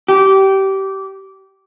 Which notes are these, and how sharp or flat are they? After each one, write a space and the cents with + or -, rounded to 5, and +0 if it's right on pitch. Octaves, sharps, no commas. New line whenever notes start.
G4 -20